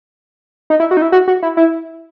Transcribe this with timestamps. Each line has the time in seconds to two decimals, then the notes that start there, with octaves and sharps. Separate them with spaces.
0.70 D#4
0.80 E4
0.91 F#4
0.97 D#4
1.02 E4
1.12 F#4
1.28 F#4
1.43 E4
1.57 E4